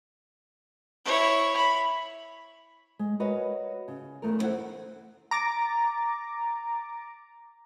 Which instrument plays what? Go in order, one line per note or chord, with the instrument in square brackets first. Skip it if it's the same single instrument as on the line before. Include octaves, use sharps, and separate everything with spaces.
[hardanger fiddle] E4 C#5
B5
[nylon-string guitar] G#3
F#4 A#4 B4 C#5 D#5 F#5
C#3
E2 A3 A#4
B3 C4 E4 C5 F#5
[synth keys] A#5 D6 A6